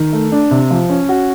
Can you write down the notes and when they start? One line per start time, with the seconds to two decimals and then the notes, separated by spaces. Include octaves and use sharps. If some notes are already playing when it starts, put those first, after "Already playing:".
Already playing: D#3
0.13 A3
0.32 D4
0.51 C3
0.70 F3
0.90 C#4
1.09 F#4